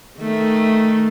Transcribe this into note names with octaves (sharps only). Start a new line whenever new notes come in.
D#3 A3